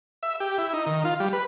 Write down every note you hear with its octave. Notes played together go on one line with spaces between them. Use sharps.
E5
G4
E4
D#4
D#3
F4
G3
B4